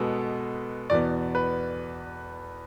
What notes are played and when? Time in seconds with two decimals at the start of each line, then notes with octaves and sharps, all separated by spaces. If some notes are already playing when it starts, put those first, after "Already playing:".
Already playing: B2 G#3 B3 A4
0.90 E2 B2 B3 D5
1.35 B4